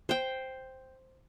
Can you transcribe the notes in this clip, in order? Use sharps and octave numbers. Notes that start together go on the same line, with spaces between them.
C5 G5